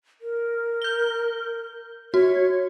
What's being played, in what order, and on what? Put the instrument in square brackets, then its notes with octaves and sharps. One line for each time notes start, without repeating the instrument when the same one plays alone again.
[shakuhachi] A#4
[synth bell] G6 G7
[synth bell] F#4 [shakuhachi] C#5